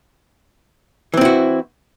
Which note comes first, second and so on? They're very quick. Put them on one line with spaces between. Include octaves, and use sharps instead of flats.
E3 C4 E4 F#4